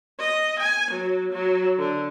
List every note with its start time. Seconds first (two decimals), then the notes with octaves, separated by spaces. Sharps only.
0.20 D#5
0.59 G#5
0.91 F#3
1.32 F#3
1.79 D3